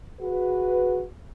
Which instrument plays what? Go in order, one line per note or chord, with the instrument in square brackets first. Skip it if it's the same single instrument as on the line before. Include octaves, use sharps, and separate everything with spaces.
[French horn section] F#4 G#4 B4